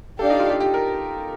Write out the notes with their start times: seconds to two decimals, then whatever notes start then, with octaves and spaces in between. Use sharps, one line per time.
0.19 D4 G4 A4 D5 F5
0.30 D#4
0.40 F4
0.49 G4
0.60 G4
0.74 A#4